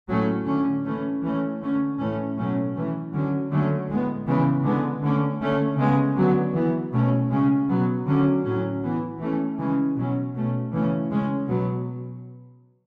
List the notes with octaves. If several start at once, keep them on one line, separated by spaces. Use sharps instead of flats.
A2 F#3 A3 C#4
D3 A3 C#4
E3 A3 C#4
E3 A3 C#4
D3 A3 C#4
A2 E3 A3 C#4
B2 F#3 A3 C#4
E3 A3 C#4
D3 F#3 C#4
D3 F#3 A3 C#4
A2 G#3 B3
C#3 E3 G#3 B3
D3 G#3 B3
D3 A3 C#4
D3 A3 C#4
C#3 G#3 B3
D3 F#3 B3
E3 B3
B2 A3 C#4
C#3 G#3 C#4
B2 F#3 B3
D3 F#3 C#4
A2 F#3 C#4
E3 B3
E3 A3 C#4
C#3 E3 G#3 C#4
B2 F#3 C#4
B2 A3 C#4
C#3 E3 A3 C#4
C#3 G#3 C#4
B2 F#3 B3